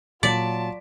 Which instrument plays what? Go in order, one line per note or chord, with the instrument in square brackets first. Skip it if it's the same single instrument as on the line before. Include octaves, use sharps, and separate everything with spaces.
[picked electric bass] A#2 [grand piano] F#3 B6 [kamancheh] F4 A5 [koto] D5